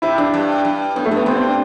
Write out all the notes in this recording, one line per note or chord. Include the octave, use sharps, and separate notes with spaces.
C3 E4
G2 D4
G2
G2
A2 B3
A3
G2
B3
G2 C4
C4
D4